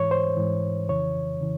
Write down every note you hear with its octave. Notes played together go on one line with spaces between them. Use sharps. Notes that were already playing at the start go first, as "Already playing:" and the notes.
Already playing: G#2 E3 C#5
C5
G#2 E3
F2 C#3 E3 C#5
C#3 E3